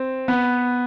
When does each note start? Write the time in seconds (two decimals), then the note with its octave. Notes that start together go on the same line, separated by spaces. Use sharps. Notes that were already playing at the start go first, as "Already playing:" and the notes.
Already playing: C4
0.28 B3